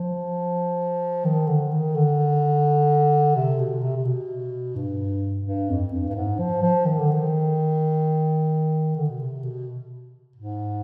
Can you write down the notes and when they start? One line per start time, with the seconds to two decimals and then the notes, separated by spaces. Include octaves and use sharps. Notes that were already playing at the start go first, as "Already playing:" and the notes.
Already playing: F3
1.25 D#3
1.47 D3
1.71 D#3
1.95 D3
3.36 C3
3.58 B2
3.81 C3
3.97 C3
4.05 B2
4.76 G2
5.46 G2
5.69 F2
5.93 G2
6.08 G2
6.16 G#2
6.39 F3
6.63 F3
6.85 D#3
6.99 D3
7.11 D#3
8.96 D3
9.09 B2
9.20 C3
9.43 B2
10.36 G#2